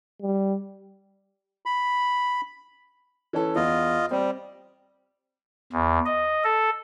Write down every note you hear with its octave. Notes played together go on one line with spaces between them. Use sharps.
G3
B5
E3 C#4 A4
E2 F4 D#5
G3 C4
E2
D#5
A4